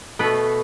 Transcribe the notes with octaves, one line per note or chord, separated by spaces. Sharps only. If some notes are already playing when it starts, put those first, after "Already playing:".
B2 A3 B3 B4